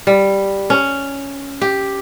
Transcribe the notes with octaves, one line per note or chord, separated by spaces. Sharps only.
G3
C#4
G4